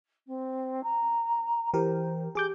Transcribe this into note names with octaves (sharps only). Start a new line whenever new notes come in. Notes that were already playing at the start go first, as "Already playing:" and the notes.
C4
A#5
E3 G4 A#4 C5
G4 G#4 D6 G6